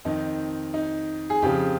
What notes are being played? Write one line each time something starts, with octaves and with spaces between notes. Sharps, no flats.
F2 D#3 D#4
D#4
G#4
F2 C#3 F3 G4